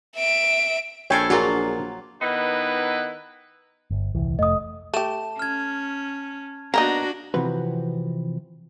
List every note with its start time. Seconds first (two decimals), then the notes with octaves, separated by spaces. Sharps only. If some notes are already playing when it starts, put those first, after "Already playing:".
0.16 E5 D7
1.10 A#1 E4 A4 C#5 F5 G5 G#5
1.30 F#3 A#3 D4 F4 F#4 G#4 A#4
2.22 D#3 B3 D#4 E4 B4
3.91 G1
4.15 D#1 C2 E3
4.39 F1 F2 A3 D#5 D#6
4.94 A3 G4 A5 E7
5.39 C#4 F6 G#6
6.74 A#3 B3 D4 D#4 F#4 A#5 A#6
7.34 C3 E3 F3 C4 F#4 B4